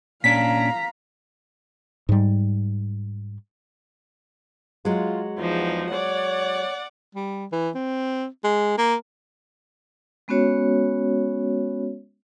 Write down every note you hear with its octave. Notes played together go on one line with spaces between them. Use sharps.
A#2 C#4 D4 F5 A#5 B6
G#2 G3
F#3 G#3 F4
E2 F3 D#4
C#5 D5 F#5
G3
E3
C4
G#3
A#3
G#3 B3 C#4 F#4 C#5